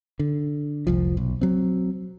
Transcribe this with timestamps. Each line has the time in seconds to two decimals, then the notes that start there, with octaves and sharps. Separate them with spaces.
0.19 D3
0.87 F1 C2 F3
1.17 B1
1.41 F#3 C4